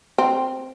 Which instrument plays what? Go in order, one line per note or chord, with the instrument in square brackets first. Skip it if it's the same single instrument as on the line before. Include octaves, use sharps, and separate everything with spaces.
[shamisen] C4